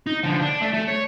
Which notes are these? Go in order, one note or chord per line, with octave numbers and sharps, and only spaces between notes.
D#4
D3 F3
D4
A3
A3
C#5